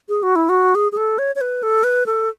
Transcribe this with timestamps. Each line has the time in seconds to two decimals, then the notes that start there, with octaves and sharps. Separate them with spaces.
0.09 G#4
0.23 F#4
0.36 E4
0.49 F#4
0.75 G#4
0.92 G#4
0.97 A4
1.18 C#5
1.35 C#5
1.41 B4
1.63 A4
1.84 B4
2.06 A4